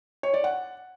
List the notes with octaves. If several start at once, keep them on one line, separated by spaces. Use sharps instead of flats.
C#5
D5
F#5